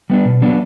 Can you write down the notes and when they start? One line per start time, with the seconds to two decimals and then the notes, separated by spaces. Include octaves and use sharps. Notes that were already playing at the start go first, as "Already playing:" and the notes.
0.10 G3 B3 D4
0.25 B2
0.42 F#3 B3 D4